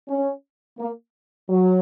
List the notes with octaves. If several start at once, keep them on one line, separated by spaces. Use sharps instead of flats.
C#4
A#3
F#3